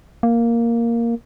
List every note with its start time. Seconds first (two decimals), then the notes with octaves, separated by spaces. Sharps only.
0.23 A#3